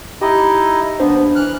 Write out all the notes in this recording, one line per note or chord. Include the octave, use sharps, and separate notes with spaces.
D#4 E4 G4 D#5
D#2 B3 D4 C5
E3 F6 F#6